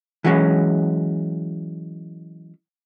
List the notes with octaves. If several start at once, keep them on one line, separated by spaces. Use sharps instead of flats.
E3 F#3 G#3 C#4